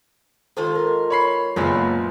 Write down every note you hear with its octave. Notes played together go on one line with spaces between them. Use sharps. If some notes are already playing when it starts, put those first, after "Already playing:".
G#2 D#3 F4 G4 A4 C5
A#4
C#5 B5 C7
F#1 A#2 C#3 E3 G#3 B3 C4